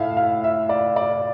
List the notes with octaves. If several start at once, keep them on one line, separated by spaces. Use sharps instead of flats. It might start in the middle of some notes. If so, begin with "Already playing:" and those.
Already playing: A2 E5 F5
F5
E5
D5
D5